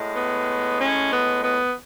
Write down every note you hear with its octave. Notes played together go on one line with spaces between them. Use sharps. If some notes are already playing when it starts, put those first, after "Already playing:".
Already playing: A2 G#3
B3
C#4
B3
B3